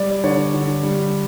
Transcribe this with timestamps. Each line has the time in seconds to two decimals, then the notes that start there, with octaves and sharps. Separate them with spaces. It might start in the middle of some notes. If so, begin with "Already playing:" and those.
Already playing: G3 D5
0.24 D3 C#5
0.54 D3
0.83 G3